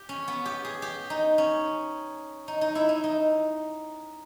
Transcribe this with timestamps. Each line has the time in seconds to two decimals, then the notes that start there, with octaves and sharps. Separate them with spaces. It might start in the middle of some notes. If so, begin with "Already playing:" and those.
Already playing: G4
0.09 C#4
0.28 B3
0.45 G4
0.65 G#4
0.82 G4
1.10 D#4
1.38 C#4
2.48 D#4
2.61 D#4
2.75 E4
2.89 D#4
3.04 D#4